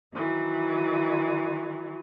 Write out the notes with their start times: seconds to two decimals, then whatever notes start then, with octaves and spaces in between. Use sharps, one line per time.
0.13 D#3 E3 F#3